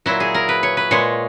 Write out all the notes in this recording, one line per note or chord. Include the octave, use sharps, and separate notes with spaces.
A#2 F#3 E4
G#4
A#4
B4
C#5
B4
A#2 G#3 C#5